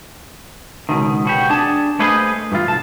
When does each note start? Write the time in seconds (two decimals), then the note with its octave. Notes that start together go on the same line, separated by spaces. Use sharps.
0.89 C#2 F#2 B2 D#3
1.25 B2 F#4 G4
1.50 D4 G#4 A5
1.99 A3 A#3 G#4 B4 C5 D#5
2.52 G2 E3 F4
2.66 B1 A5